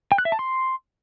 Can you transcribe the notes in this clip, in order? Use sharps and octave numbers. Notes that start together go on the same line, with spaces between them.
G5
F#6
E5
A5
C6